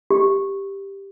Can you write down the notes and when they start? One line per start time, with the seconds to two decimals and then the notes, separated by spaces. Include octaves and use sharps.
0.11 G4